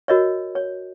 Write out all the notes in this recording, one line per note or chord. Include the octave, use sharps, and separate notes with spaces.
F#4 A#4 C#5 D#5
C#5